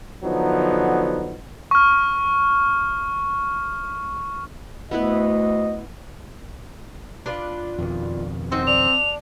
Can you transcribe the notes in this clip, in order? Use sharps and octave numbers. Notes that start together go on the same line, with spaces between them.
D3 F3 F#3 B3 D#4
C#6 F6
D2 B3 E4 B4 D#5
D4 F4 B4
F2 B2 D#3
C4 D#4 F#4 C5
D4 F7